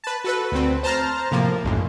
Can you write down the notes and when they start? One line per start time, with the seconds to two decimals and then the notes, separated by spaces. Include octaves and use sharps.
0.04 B4 A5
0.24 F#4 A4 B4
0.52 D2 C4
0.83 C5 A5 A#5 F6
1.31 A2 C3 F3 A#3
1.64 B1 F#2 A2